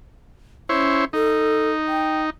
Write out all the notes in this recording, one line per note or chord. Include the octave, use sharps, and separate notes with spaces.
C#4 E4 C5 C#5
D#4 A4
G5